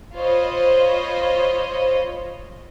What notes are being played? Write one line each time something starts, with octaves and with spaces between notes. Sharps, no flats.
F4 C5 C#5 D#5 B5